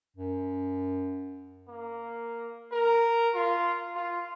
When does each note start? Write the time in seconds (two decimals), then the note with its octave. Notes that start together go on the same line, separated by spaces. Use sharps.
0.17 F#2
1.68 A#3
2.72 A#4
3.35 F4
3.95 F4